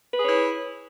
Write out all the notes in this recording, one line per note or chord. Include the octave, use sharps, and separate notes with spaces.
E4 G#4 B4 C#5